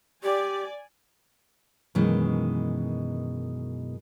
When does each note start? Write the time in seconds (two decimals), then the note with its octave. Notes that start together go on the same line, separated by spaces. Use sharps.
0.24 G4 D5 G#5
1.95 F#2 B2 D#3 E3 G#3